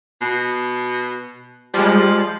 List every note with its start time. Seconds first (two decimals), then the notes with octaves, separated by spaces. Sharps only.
0.22 B2
1.74 F3 G3 G#3